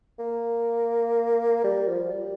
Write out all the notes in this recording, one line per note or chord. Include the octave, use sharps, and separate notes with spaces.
A#3
G3
F3
G3